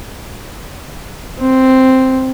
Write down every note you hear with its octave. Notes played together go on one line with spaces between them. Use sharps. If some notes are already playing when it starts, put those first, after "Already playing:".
C4